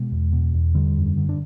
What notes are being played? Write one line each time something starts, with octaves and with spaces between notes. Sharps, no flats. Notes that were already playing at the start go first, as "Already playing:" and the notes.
Already playing: B2 G#3
E2
B2
E2
D3 G3
F#2
D3
D4